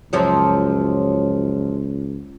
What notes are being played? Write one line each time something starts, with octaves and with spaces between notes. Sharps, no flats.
C#2 F#2 F3 F#3